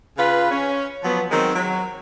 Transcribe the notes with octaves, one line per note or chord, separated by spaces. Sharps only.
C#3 F4 B4
C#4
F3 F#3 B3
D#3 F#3 G#3 C4
F#3